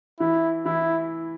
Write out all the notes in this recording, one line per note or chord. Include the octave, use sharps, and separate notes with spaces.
E3 E4
E3 E4